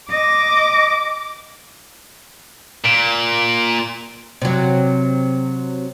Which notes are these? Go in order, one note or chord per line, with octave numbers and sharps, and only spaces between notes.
D#5 D6
A#2 D7
C3 F#3